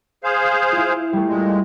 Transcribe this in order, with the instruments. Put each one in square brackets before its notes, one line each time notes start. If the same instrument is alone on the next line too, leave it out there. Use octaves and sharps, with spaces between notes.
[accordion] G#4 C5 F5
[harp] E4 F4
G3 A3
[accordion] A#2 G#3